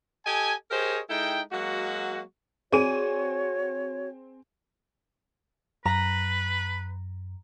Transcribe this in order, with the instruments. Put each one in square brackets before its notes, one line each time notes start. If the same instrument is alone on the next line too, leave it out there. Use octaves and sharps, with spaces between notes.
[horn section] G4 A4 D#5 G#5
G4 G#4 A#4 C5 C#5 D#5
G#3 D#4 E4 A4 G5
F#3 G#3 A#3 F#4
[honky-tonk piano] C4 G#5 D#7 [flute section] F#4 C#5 [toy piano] G#4 D5
[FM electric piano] F#2 [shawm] B4 [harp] A#5